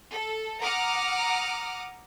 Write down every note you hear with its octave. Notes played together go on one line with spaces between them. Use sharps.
A4
F#5 A#5 D6 D#6 F6